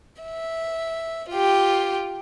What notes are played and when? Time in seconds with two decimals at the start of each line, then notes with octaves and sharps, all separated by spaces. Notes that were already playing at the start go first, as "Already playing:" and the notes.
0.22 E5
1.30 F4 G4